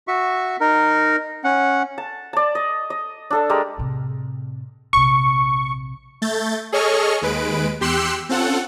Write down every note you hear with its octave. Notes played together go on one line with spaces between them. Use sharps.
F#4 E5 C#6
D#4 A#4
C#4 F#5
A5
D5 A5
D#5
D#5
D4 A4 A5
G#3 G4 A#4
A2 C3
A#1 C3 C#6
A3 G6 A6
G#4 A4 C#5 D#5 C#6 F6
D#2 G#3 B4 D7
E2 G4 C6 E6 F#6 C#7
C4 C#4 F4 A4 F#5